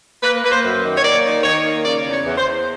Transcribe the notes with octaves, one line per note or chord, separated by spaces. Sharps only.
A#3 B4
A#3 B4
C5
F#2
D#3
C#5
A#3 D5
D#3
D#3 C#5
A#3
C#3 D5
E2
C#5
E2
C5
E2